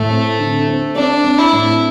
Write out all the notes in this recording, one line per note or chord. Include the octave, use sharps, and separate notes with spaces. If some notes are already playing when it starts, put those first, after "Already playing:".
Already playing: A2 A3
C4
D3
C4
C4 D4
C4
E4
A2